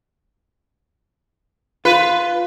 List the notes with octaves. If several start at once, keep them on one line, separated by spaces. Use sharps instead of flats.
F4 B4